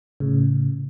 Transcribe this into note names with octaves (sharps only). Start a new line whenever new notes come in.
A2 C#3